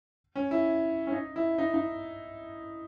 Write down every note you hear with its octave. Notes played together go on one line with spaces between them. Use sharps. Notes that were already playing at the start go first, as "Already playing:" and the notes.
C#4
E4
C#4
D#4
E4
D#4
D#4